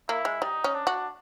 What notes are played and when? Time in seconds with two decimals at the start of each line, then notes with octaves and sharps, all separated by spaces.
0.09 A#3 E4
0.25 G#3
0.42 G3 D#4
0.64 C#4
0.75 D4
0.87 F#4